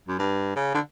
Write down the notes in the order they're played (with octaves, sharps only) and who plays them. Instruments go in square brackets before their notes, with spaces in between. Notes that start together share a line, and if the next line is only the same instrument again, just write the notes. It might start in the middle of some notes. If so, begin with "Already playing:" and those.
[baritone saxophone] F#2
G2
C#3
D3